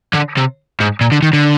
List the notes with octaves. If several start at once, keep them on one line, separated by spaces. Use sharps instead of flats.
D3
C3
G#2
A#2
D3
D#3
D3